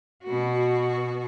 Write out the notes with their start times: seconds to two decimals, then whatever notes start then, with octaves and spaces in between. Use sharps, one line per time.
0.23 B2 F#4